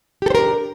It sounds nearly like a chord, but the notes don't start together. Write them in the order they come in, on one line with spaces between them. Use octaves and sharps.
G4 A4 C5 A#4 D4